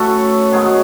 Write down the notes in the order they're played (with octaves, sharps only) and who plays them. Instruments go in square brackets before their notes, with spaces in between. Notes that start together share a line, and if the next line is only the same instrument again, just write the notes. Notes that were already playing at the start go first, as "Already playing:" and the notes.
Already playing: [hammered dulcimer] A2 F#3 A3 C#4 A4 B4
G#2 D#3 F#3 B3 G#4